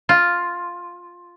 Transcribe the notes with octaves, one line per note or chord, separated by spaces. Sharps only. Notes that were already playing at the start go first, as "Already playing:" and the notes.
F4